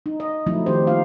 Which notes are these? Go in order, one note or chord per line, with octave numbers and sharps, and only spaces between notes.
D#4
D#5
F3 F#3 A3 C4 D#4 E4
D#3 F3 C4 D#4 G4 C5
A#3 D#4 F4 F5